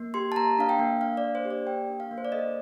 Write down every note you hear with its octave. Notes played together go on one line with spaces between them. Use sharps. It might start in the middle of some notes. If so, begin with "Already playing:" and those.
Already playing: A#3
G4 C6
A5
A#3 A#5
D4 F5
G5
A#3
D4 F5
D5
A#3
C5
G4
D5
A#3 G5
D4
F5
A#3
C5
D5
A4 D#5